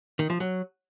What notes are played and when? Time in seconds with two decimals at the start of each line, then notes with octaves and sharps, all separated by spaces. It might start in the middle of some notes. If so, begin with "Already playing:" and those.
0.19 D#3
0.30 F3
0.40 F#3